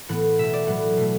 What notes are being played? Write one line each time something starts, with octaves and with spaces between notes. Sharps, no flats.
A2 E3 B3 F#5
B2 A3 E5
D5
A2 F#3 B3 F#5
B2 A3